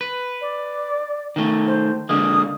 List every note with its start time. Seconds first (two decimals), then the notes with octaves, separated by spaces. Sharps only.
0.01 B4
0.41 D5
1.36 D#3 A3
1.67 C5
2.09 D3 G#3 A#3 D#6